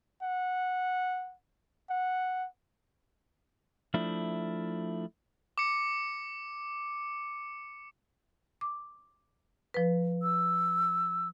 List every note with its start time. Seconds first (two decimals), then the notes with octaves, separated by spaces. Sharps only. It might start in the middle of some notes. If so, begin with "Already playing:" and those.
0.22 F#5
1.90 F#5
3.94 F3 A3 D4 E4
5.58 D6 C#7
8.61 D6
9.74 F3 B4
10.23 E6